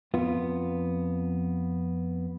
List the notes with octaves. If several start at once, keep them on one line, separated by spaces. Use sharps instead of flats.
F2 B3 F4